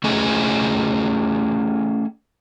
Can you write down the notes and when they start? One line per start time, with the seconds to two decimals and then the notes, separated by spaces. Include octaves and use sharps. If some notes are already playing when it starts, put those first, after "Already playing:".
0.04 A3 C#4 E4 G#4 D#5 G#5